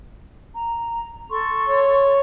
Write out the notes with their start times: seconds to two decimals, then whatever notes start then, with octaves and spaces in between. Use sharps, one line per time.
0.53 A#5
1.30 A4 C6 C#6
1.68 C#5